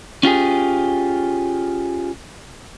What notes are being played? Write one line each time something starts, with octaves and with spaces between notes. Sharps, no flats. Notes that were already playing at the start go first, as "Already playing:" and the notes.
C#4 F4 G4 G#4